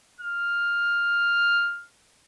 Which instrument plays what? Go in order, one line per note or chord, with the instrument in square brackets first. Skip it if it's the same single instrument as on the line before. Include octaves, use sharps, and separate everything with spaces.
[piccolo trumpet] F6